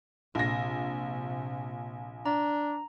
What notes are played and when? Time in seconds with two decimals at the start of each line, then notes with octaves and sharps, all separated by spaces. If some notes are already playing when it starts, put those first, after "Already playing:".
0.35 A#1 C3 A#6
2.26 D4 A#5